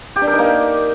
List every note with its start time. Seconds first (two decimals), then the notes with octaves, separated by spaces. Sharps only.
0.16 G4
0.22 D4
0.27 A#4
0.33 D#4
0.39 A#3